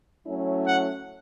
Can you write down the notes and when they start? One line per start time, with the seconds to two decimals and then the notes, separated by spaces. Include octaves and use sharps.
0.26 F#3 A3 C#4 E4
0.65 F#5